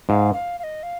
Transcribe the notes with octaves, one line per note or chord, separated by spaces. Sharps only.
G#2 F5
F5
F5
D#5
F5